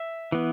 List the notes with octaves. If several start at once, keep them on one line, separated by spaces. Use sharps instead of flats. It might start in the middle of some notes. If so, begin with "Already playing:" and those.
Already playing: E5
E3 B3